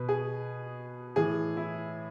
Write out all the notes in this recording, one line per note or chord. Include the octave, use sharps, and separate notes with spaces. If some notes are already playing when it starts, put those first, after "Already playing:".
Already playing: B2 B4
G#4
A2 E3 G#4
E4